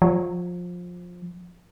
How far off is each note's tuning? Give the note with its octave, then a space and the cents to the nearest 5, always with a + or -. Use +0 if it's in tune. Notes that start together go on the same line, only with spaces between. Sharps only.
F3 +20